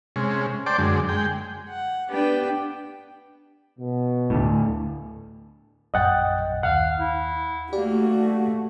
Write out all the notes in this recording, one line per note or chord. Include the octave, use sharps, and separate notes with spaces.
C3 G#3 C#4
C5 D5 G5 A5 D6
F#2 D3 G#3
G#3 G5
F#5
B3 D4 G4 B4 G5
B2
D2 A2
A#1 F#2 D#5 F#5 G5 A6
D#2 F5 F#5
E4
A3 A#3 F#4 G4 D5